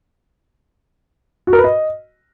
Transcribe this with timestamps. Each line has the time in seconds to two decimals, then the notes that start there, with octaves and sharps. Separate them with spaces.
1.47 F#4
1.53 A#4
1.58 B4
1.64 D#5